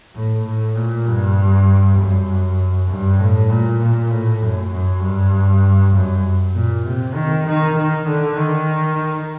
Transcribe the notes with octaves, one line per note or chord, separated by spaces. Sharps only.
A2
A2
A#2
G2
F#2
G2
A2
A#2
A#2
A2
F#2
F#2
G2
F#2
A#2
C3
D#3
D#3
D#3
D3
D#3